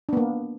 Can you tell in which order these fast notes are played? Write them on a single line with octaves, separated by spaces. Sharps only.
D4 B3 A#3